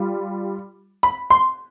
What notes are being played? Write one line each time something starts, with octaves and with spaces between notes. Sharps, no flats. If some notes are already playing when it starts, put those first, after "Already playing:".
Already playing: G3 F4
B5
C6